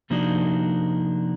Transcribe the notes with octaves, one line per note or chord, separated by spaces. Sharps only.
C3 F3 A#3 D4 D#4 F#4